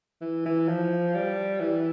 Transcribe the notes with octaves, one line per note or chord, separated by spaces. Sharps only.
E3
E3
F3
G3
E3